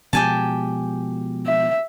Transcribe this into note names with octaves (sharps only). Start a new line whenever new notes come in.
B2 F3 G#3 G4 G#5 A5
E5